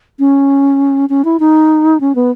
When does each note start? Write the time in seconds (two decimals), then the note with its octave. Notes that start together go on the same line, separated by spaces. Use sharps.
0.19 C#4
1.09 C#4
1.25 E4
1.39 D#4
2.00 C#4
2.15 B3